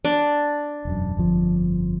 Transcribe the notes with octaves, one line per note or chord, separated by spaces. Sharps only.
D4
E1 F#2
G1 F2 F3